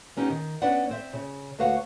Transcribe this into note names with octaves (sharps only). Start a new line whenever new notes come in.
B3 C#4 D#4 G4
D#3
B3 C#4 D4 B4 D5 F#5
C4 C5 E5
C#3
D2 F#4 B4 C#5 F5 F#5